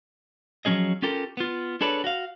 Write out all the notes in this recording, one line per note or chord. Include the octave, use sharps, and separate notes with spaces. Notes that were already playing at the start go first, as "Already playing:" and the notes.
F3 F#3 C#4 G#4 D#5
C#4 F4 G4 A4 A#4
B3 F4
D4 G#4 A4 B4 C#5 D5
F#4 F5